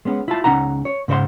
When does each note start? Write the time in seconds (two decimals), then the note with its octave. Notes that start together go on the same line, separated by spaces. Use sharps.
0.05 G#3 B3 C#4
0.28 E4 F4 A5
0.44 C#2 C#4 D#4 F#5 A#5
0.85 C#5
1.08 G#2 C#3 C5 C#5 F#5 C6